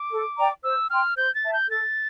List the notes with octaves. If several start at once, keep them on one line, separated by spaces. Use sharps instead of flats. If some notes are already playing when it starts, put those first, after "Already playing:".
Already playing: D6
A4
D5 G5 A#5
C5 E6
G5 C6 F6
C5 G6
A6
E5 A5
G6
A4 A6